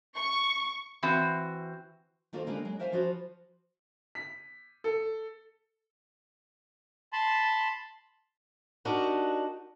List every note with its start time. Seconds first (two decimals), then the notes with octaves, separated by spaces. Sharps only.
0.16 C#6
1.03 E3 C4 F#4
2.33 D#3 A#3 F4 A4 C5
2.47 D3 G#3 A#3 G4 A#4 B4
2.65 F#3 G#3
2.79 A#4 C5 E5 F5 G5 G#5
2.92 F3 F4 F#4 B4 C5
4.15 B6
4.84 A4
7.13 A5 B5 C6
8.85 D4 D#4 F#4 G4 A#4